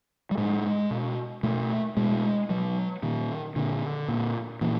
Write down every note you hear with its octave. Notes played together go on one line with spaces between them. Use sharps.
G3
A2 G#3
B2
B2 A3
B2 G#3
B2 F#3
A#2 D#3
A#2 D3
A#2
A#2 E3